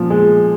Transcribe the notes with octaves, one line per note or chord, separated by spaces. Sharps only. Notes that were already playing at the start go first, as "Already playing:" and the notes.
Already playing: A#2 F3
G#3